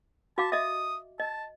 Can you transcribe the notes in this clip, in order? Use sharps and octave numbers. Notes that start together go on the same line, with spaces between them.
F#4 F5 A5 D6
D#5 E5 D#6
D#5 A5